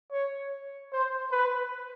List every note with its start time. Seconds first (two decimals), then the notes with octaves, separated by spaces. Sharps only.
0.11 C#5
0.92 C5
1.31 B4